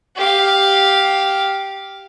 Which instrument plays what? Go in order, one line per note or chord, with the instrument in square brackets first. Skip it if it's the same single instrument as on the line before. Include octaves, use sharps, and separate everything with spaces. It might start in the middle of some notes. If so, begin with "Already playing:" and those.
[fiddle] G4 F5